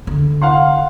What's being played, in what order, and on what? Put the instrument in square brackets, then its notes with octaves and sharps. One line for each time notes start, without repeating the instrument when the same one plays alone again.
[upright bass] D3
[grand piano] F5 F#5 C6